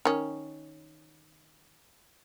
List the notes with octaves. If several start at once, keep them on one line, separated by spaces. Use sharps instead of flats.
D#3 C#4